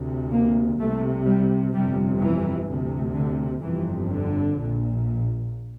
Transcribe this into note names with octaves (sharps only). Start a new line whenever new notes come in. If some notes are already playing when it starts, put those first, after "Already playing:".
Already playing: D2 C3
A#3
C2 C3 A3
G3
G1 F2 C3 G3
E3
D2 C3
D3
G1 F2 C3 E3
D3
A#1 A#2